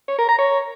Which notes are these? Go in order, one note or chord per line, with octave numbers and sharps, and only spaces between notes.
C#5
A#4
A#5
C#5